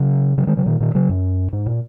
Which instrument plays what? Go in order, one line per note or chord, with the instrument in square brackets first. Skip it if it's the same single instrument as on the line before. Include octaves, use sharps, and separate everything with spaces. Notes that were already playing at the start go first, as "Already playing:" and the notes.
Already playing: [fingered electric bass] C#3 F#3
C#3 F#3
D#3 G#3
C#3 F#3
A#2 D#3
A#2 D#3
C#3 F#3
F#2
G#2
A#2